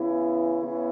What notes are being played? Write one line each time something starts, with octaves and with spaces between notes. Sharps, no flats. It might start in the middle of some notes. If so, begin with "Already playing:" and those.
Already playing: C#3 E3 B3 E4
C#3 E3 B3 E4